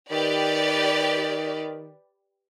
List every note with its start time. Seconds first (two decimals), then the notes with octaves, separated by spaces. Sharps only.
0.11 D#3 G4 B4 D5